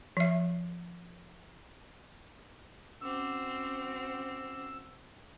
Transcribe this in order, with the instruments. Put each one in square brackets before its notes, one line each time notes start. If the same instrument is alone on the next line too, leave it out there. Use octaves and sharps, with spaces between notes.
[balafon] F3 E5
[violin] C4 F#4 [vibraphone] C#4 D6 [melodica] E6